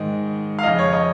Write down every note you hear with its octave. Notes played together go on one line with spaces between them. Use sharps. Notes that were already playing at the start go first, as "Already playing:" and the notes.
Already playing: G#2 D#3 D#5
F5
F2 C#3 D#5
C#5
D#5